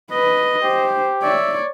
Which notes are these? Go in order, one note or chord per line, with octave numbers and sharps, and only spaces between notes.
B4 D#5
G4 C5
C#5 D5 E5